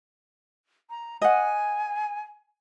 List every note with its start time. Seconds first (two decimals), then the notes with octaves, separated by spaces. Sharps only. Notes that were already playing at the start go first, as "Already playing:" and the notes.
0.90 A#5
1.22 D#5 F#5 G#5